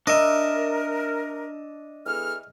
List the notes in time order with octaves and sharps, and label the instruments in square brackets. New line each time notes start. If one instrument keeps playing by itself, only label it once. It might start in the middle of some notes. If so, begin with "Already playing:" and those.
[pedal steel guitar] D4 E5 [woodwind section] A#4 [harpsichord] D#5
[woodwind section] E2 A4 F6